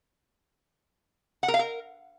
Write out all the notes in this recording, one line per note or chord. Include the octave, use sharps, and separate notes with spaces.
F#5
A#4
F5
A#4